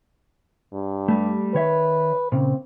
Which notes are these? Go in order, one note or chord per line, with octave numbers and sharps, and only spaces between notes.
G2
G3 A3
D#3 B4 C#5 E5
A#2 C#3 C4